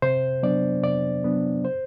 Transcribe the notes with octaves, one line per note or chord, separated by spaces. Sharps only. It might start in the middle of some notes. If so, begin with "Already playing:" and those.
C3 C5
F#3 B3 D4 D5
C3 D5
F#3 B3 D4
C5